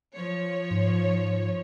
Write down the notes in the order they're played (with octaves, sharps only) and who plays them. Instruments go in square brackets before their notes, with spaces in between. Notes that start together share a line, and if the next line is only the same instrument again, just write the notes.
[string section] F3 C#5
[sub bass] G#2